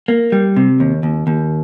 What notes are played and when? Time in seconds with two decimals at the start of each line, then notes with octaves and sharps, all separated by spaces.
0.08 A#3
0.32 G3
0.56 C3
0.80 D#2
1.03 D#2
1.27 D#2